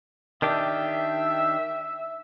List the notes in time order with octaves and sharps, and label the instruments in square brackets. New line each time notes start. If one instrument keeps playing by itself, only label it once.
[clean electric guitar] D#3 D4 G4 [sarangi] E5